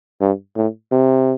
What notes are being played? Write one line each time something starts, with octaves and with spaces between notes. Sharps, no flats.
G2
A2
C3